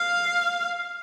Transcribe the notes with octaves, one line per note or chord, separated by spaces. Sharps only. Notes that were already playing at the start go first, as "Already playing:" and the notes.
Already playing: F5